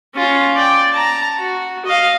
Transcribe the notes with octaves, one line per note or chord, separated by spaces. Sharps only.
C#4 F4
D5 G5
A5 A#5
F#4
D#5 F5